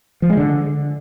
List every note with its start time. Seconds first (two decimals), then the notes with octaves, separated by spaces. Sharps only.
0.22 F3
0.30 G#3
0.37 D3